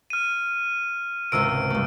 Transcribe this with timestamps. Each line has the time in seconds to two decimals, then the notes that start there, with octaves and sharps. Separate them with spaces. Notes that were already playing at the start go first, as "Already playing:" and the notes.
0.10 F6 D#7
1.32 G#1 C#2 C3 E6 D7
1.70 G2 A3